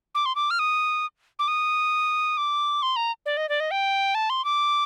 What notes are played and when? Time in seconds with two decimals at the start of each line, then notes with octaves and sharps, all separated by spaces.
0.15 D6
0.26 C6
0.35 D6
0.51 F6
0.59 D#6
1.39 D6
1.48 D#6
2.37 D6
2.82 C6
2.96 A#5
3.26 D5
3.37 D#5
3.49 D5
3.60 D#5
3.71 G5
4.15 A5
4.30 C6
4.45 D6